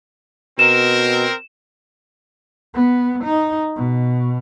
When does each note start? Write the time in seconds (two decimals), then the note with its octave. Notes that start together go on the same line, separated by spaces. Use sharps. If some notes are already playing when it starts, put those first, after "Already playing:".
0.59 B2 C4 A#4 E7
2.74 B3
3.24 D#4
3.76 B2